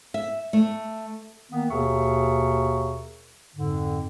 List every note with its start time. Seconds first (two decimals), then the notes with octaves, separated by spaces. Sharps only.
0.14 E5
0.53 A3
1.51 D#3 A#3 B3
1.71 D#2 B2 G#4 A#4 E5 C#6
3.55 F2 G#2 D3